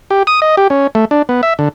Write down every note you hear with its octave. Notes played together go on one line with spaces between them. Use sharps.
G4
D#6
D#5
G4
C#4
A3
D4
B3
E5
D3